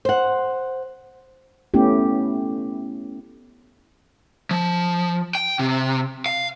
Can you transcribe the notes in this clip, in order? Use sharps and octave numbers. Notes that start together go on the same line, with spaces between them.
C5 F#5
A3 B3 C#4 E4 G4
F3
G5
C3
F5